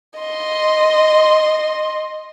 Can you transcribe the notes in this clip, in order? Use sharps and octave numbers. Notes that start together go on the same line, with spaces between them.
D#5 C6